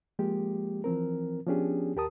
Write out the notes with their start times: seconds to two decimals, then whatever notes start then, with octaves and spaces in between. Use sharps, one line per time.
0.19 F3 G#3 A#3 G4
0.84 E3 F3 C4 A#4
1.47 F3 B3 C#4 D4 G4 G#4
1.96 D#2 G4 A#4 A5 D#6